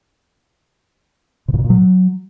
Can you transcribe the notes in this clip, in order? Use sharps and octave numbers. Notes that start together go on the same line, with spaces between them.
C3
A#2
B2
A#2
F#3